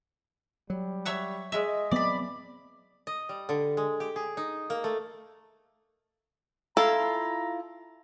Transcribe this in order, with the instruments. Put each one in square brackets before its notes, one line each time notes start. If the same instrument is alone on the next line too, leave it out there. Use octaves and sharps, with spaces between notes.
[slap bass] F#3 [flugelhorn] G3
[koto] C#5 E5 F#5
[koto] G#3 E5 [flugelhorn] D#5
[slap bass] F#3 B3 C4 [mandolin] D5 B5
[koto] D#5
G3
D3
G#3
G4
G#4
D#4
A#3
A3
[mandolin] E4 F4 [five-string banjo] A4 [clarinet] A#5